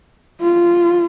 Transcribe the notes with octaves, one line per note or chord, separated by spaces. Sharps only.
F4